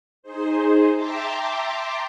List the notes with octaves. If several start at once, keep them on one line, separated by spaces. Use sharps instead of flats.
D#4 G#4 C5
E5 G5 A5 A#5 C6 D6